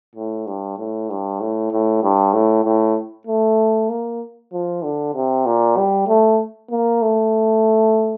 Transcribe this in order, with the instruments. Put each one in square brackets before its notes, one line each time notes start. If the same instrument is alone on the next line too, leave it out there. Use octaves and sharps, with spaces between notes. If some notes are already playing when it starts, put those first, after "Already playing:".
[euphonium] A2
G2
A2
G2
A2
A2
G2
A2
A2
A3
A#3
F3
D3
C3
A#2
G3
A3
A#3
A3